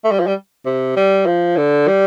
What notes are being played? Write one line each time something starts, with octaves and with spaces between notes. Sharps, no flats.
A3
G3
F3
G3
C3
G3
F3
D3
G3